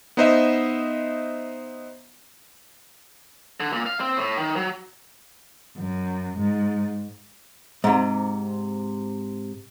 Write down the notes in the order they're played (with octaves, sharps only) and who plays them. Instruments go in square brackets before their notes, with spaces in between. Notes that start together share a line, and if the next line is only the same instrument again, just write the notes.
[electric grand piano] B3 D#4 C5 D#5 E5
[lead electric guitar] D3
A#2
F5
C4
A2
D#3
F#3
[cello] F#2
G#2
[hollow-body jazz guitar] G#2 C3